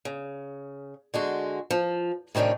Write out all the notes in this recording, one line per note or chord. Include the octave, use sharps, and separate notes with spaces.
C#3
D3 G#3 F#4
F3
A2 C3 D#3 C#4 D4